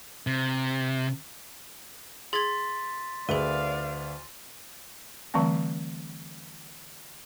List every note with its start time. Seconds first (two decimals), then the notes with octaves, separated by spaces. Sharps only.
0.27 C3
2.33 G#4 C6 G#6 A6 B6
3.29 D2 G#4 A#4 B4 D5 E5 F5 D#7
5.34 D3 E3 G3 A3 C4 A#5